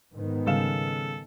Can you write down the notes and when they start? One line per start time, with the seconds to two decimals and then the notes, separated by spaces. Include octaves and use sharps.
0.14 G#2 D#3 B3
0.47 C#3 G3 A4 F5 E7